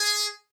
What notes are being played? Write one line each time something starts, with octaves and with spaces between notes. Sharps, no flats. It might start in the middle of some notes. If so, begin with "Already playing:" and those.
Already playing: G#4